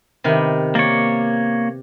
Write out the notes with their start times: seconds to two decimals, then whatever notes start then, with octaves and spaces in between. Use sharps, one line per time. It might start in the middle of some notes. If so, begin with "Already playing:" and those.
0.24 C3 D#3 B3
0.75 A#3 C#5 D5